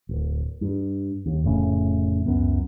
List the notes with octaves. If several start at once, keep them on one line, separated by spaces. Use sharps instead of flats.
D1
G2
D#2
F1 A2 C#3
C#2 F#2 B3